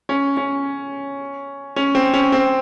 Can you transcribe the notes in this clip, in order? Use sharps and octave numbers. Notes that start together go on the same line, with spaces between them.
C#4
C#4
C#4
C4
C#4
C4